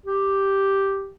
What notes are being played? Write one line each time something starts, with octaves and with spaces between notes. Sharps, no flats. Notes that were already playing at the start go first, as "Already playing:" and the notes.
G4